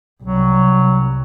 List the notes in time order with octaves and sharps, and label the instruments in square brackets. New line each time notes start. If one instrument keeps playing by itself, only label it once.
[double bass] C2 [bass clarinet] F#3